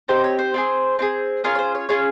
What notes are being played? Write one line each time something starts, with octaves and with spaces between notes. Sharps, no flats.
C4 D#4 G4 C5
C#5
C5
C4 F4 G#4
C4 F4 G#4
C#4 F4 G#4 A#4
C#5
C5
C#5
C#4 F4 G#4 C#5